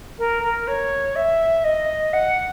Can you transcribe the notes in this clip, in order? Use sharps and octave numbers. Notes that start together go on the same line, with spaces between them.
A#4
A#4
C#5
E5
D#5
F#5